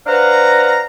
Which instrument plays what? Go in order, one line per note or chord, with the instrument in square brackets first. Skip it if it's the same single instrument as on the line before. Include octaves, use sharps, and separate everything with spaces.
[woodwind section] D4 B4 C5 F5 F#5 A#5